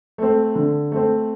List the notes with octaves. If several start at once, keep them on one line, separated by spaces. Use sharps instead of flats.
A3 C4
D3
A3 C4